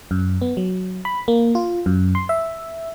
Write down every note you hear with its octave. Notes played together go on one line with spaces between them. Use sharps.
F#2
B3
F#3
B5
A#3
F4
F#2
C6
E5